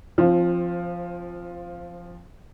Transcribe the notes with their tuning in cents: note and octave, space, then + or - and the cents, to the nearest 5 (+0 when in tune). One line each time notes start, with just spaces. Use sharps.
F3 -5 C4 +20